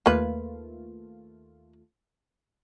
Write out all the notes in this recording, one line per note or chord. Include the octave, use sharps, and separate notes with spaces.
D#2 A3 A#3 F4 B4